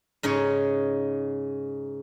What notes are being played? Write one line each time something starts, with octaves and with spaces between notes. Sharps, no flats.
G#2 C#3 D#4 C#5